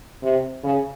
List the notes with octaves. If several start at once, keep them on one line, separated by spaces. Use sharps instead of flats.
C3
C#3